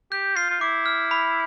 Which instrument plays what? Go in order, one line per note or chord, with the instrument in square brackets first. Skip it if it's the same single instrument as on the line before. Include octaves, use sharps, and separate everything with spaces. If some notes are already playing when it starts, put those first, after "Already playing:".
[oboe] G4 [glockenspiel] G6
[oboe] F4 [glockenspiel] C7
[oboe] F4
[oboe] E4 [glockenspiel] D6
[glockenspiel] F6
B5